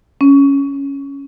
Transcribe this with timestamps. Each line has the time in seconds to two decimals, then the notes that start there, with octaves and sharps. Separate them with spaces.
0.21 C#4